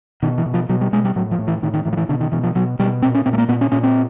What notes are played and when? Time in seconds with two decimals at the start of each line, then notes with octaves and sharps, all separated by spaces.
0.23 B2 D#3
0.38 E3
0.46 B2
0.54 F3
0.69 B2 F#3
0.81 G3
0.92 B2 G#3
1.05 G3
1.16 A2 F#3
1.31 F3
1.39 A2
1.48 E3
1.62 A2 D#3
1.74 D#3
1.86 A2 E3
1.93 F3
1.97 E3
2.09 B2 D3
2.21 D#3
2.32 B2 E3
2.44 F3
2.55 B2 F#3
2.79 B2 G3
3.02 A#2 C4
3.15 C#4
3.26 A#2 C4
3.33 A3
3.38 A#3
3.48 A#2 B3
3.61 C#4
3.72 A#2 C#4
3.83 C4